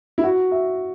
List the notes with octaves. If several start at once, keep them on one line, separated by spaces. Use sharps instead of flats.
E4
F#4
E5